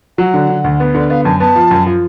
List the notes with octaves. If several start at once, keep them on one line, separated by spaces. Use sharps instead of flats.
F#3 F#5
D3
D3
D2
B3
D3 D5
B3 F5
F#2 A5
B3 A5
F3
F#2
F3